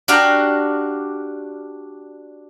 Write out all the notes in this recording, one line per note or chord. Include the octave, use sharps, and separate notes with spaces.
D4 F#4 G4 F5 G5 A#5